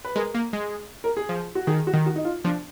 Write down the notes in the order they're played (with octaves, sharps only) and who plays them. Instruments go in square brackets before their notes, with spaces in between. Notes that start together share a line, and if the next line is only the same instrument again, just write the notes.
[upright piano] B4
[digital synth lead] G#3 [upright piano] A#4
[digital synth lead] A#3
G#3
[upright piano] A#4
G#4
[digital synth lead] F3
[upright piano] F#4
[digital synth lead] D#3 [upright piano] G#4
[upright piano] F#4
[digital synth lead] D#3
[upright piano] F#4
D#4
F4
[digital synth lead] F3 [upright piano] D4